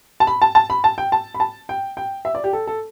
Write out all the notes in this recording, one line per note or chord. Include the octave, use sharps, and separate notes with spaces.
A5
B5
A5
A5
B5
A5
G5
A5
B5
A5
G5
G5
E5
D5
G4
A4
A4